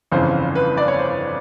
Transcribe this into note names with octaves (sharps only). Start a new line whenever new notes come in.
G1 F2 C#3 E3 C5
B4
D5
C#5
C5